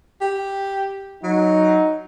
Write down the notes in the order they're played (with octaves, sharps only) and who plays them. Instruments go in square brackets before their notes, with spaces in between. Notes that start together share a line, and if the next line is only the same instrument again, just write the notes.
[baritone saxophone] G4
[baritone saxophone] F#3 [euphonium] D#4